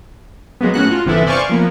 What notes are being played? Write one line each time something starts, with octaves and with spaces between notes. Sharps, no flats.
F#3 G#3 A#3 B3
A2 C#4 F#4 F#6
F4
G1 C3 E3 B3 E4 A4
C5 D5 F5 G#5 C#6
F3 A#3 B3